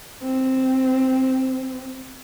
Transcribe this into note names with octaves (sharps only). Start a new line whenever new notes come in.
C4